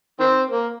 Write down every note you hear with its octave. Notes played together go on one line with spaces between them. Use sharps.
D#3 C4
A#3